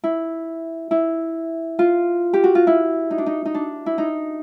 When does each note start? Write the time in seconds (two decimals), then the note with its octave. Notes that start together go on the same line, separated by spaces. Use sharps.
0.04 E4
0.91 E4
1.79 F4
2.33 G4
2.44 F#4
2.55 F4
2.67 E4
3.11 D#4
3.18 D4
3.26 D#4
3.45 D#4
3.54 D4
3.86 E4
3.98 D#4